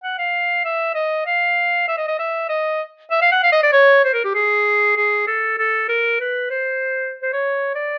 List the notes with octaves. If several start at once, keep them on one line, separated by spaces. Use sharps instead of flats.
F#5
F5
E5
D#5
F5
E5
D#5
D#5
E5
D#5
E5
F5
F#5
F5
D#5
D5
C#5
C5
A#4
G4
G#4
G#4
A4
A4
A#4
B4
C5
C5
C#5
D5